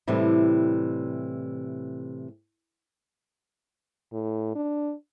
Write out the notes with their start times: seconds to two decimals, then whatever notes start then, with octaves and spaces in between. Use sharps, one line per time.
0.07 A2 C3 E3 G3
4.13 A2
4.55 D4